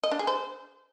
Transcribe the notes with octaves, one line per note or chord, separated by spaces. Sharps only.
D#5
D4
G#4
C5